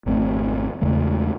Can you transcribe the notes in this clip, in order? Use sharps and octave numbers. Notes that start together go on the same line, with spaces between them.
G#1 F2 A3 C4
E2 C#3 G#3 A3